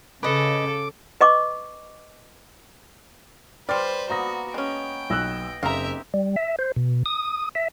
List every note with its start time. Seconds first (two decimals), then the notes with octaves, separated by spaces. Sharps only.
0.23 C#3 A4 B4 D#5 D6
1.21 B4 D#5 C#6 D6
3.69 G3 B4 C5 D5 C6 F6
4.10 A#3 B3 F#4 A#5 D#6 A#6
4.54 G#3 C#4 G5
5.10 B1 D#5 E6 F#6
5.63 F#1 C4 D#4 G4 A#4 E5 F5 A#5
6.14 G3
6.36 E5
6.59 C5
6.76 B2
7.06 D#6
7.55 E5